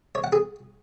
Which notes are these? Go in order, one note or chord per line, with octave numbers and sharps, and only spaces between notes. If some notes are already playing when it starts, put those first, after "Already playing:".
C#5
F#5
G#4